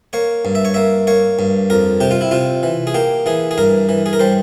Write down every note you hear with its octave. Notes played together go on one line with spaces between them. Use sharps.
A#3 C#5
G2
E5
C#5
A#3 E5
A#3 C#5
G2
F2 A#4
C3 G4
F4
E4
C3 F4
E3
G#4
A#3 G4
E3 G#4
G#4
G2 A#4
E3
G#4
A#4
G3 C5